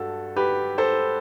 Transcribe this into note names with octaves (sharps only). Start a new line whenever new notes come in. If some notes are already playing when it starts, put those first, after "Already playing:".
Already playing: G2 F#4 A4
G4 B4
A4 C5